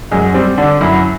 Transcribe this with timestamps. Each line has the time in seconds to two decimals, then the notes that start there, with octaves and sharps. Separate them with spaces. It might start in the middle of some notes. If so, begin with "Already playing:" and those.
0.11 F#2 G#3
0.34 G3 C4
0.58 D3 D4
0.81 F#2 E4